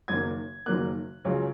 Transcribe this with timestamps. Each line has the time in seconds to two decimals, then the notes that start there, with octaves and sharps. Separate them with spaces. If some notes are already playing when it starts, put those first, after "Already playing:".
0.08 F#1 F#2 D#3 F#3 A#3 G#6
0.66 F#1 F#2 D#3 F#3 A#3 F#6
1.24 C#2 C#3 F#3 C#4